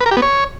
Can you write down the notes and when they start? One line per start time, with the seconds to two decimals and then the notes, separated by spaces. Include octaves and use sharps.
0.01 B4
0.06 A#4
0.11 G4
0.17 B3
0.22 C#5